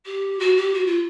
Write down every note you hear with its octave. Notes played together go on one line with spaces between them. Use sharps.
G4
F#4
G4
F#4
F4